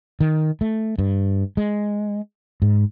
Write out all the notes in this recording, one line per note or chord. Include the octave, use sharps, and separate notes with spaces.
D#3
A3
G2
G#3
G#2